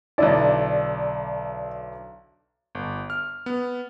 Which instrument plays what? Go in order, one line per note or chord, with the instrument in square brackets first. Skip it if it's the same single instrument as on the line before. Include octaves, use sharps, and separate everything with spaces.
[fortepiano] B1 D3 E4 [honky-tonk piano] D5
[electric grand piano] G1
F6
B3